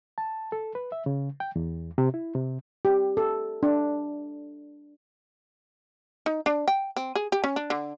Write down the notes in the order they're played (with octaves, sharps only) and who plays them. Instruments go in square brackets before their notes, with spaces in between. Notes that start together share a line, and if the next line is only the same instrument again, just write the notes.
[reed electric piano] A5
A4
B4
E5
C#3
G5
E2
C3
E4
C3
[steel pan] G4
A4
D4
[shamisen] D#4
D4
G5
C4
G#4
G4
C#4
D4
D3